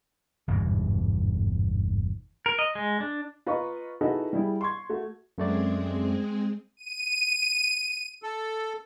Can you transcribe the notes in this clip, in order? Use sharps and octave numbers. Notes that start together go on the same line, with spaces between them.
G1 E2 G#2 B2
A#4
D#5
G#3
D4
F4 B4 D#5 A#5 C#6
D#4 E4 F#4 G#4 A4 B4
G3 E4 G#4
C6 C#6 G#6
A3 F#4
F#2 G#3 A3 C4 G#4 D5
D#7
A4